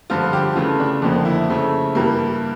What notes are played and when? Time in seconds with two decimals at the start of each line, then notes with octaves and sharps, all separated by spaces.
0.10 G2 D3 F3 F4
0.33 G4
0.56 C#3 E3 A3 F4
0.80 D4
1.02 F2 D3 F3 A#3
1.25 E4
1.49 C#3 F3 A3
1.95 G2 E3 G3 A#3